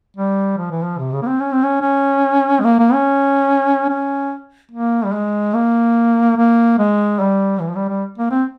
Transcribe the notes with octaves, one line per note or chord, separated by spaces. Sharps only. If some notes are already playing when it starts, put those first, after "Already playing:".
G3
F3
E3
F3
C3
C#3
A#3
C4
C#4
C4
C#4
C#4
G#3
A#3
A#3
C#4
C#4
A#3
G3
G#3
A#3
A#3
G#3
G3
E3
F3
G3
G3
A#3
C4